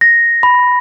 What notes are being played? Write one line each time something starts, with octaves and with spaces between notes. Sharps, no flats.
A#6
B5